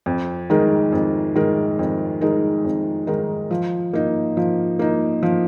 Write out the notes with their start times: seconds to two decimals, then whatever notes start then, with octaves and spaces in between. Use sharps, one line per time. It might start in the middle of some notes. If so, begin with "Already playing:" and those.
0.06 F2
0.50 D#3 G#3 D#4 A#4
0.92 F2
1.35 D#3 G#3 D#4 A#4
1.79 F2
2.21 D#3 G#3 D#4 A#4
2.65 F2
3.07 D#3 G#3 D#4 A#4
3.51 F3
3.93 A#3 D#4
4.37 F3
4.79 A#3 D#4
5.23 F3